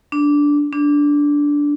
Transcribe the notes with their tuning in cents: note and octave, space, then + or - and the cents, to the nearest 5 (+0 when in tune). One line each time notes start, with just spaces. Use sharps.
D4 -10
D4 -10